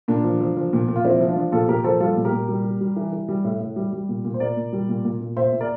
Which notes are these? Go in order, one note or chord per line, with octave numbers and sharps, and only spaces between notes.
A#2 A#3 D4
F3
F3
F3
A#2
A#2
F4
F3 C4 E4
F3
D4 F4
F3
A#2 F4 A4
A#2 G4 A#4
F3 A4 C5
G3 F4 A4
A#2
G4 A#4
A#2
G3
G3
G3
E3
E3
G3
A2
A2
G3
G3
A#2
A#2
C5
A#2 A#4 D5
A#2
G3
A#2
A#2
A#2
A#2 C5 E5
A#2
A#4 D5